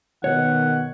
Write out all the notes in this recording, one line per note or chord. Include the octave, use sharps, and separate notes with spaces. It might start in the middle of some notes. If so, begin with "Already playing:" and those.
B2 D#3 C#5 F#5